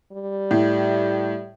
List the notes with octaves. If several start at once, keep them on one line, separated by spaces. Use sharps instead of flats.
G3
A2